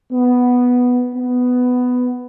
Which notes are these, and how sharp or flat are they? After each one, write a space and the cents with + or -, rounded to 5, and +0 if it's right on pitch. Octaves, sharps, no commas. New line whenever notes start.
B3 +0
B3 +10